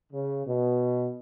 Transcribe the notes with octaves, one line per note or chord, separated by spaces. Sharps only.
C#3
B2